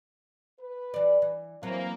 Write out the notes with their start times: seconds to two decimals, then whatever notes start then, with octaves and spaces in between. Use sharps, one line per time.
0.60 B4
0.94 E3 D5
1.22 E3
1.63 E3 F#3 A#3 C4